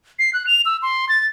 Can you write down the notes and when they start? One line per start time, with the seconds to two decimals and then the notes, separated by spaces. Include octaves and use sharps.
0.19 C7
0.33 F#6
0.47 F7
0.66 E6
0.82 C6
1.09 A6